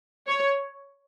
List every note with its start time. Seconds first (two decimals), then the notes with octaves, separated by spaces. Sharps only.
0.28 C#5